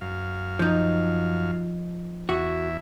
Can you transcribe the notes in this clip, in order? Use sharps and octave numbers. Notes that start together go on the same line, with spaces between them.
F#2 F5
F3 D#4
E2 F#4 E5